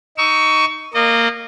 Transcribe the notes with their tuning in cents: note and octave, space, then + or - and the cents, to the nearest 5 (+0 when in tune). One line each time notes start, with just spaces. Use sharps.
D#4 +0 C#6 +20 E6 +0
A#3 -10 D#5 -30